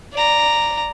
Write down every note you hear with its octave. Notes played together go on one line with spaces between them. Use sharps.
D5 A#5